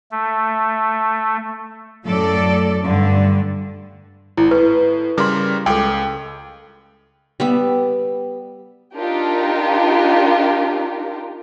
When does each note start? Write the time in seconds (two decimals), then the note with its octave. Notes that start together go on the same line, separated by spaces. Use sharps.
0.12 A3
2.05 F#2 A2 A4 D5
2.83 G2 D3
4.37 G#1 E4
4.51 A2 B4
5.18 C#3 G3 A#4 C6 D6
5.66 C#2 A4 G5 D6
7.40 G3 B3 E5
8.93 D4 D#4 F4 G4 A#4